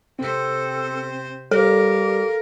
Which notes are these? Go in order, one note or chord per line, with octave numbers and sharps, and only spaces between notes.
C3 C4 A4 C5
G3 G4 A4 A#4 F5